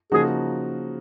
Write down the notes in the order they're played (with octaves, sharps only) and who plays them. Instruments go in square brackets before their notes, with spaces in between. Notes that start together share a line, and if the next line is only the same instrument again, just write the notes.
[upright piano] C#3 F3 A#3 D#4 F#4 [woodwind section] G#4